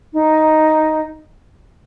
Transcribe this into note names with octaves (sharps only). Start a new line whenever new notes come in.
D#4